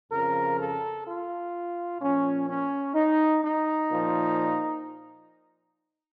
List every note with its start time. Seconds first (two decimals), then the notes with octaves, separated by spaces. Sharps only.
0.10 F2 C#3 F3 A#4
0.58 A4
1.06 F4
2.00 A#2 F3 C#4
2.48 C#4
2.95 D#4
3.43 D#4
3.90 A#2 F3